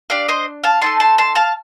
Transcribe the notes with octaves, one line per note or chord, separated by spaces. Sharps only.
D4 G4 D5 F5
C5 D#5
F5 A5
A3 C4 D#4 A5 C6
A5 C6
A5 C6
F5 A5